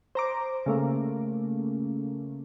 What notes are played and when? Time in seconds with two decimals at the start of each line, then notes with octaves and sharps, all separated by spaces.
0.15 C5 A#5 D6
0.66 C#3 A3 A#3